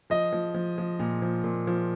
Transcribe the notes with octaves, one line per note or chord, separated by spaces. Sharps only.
F3 D#5
F3
F3
F3
A#2
F3
A#2
F3